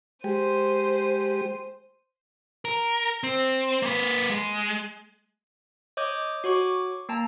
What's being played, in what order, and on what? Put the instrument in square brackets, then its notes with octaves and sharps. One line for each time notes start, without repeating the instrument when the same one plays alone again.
[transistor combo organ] G#3 G4 [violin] C5 D#7
[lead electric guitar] A#4
C4
A#3 B4
G#3
[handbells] C#5 D#5 D6 D#6 G6
F#4 C#5 C#6 D6
A#3 G5 A5 A#5